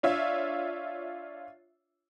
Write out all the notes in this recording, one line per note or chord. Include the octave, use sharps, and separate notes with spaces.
D4 F4 C#5 E5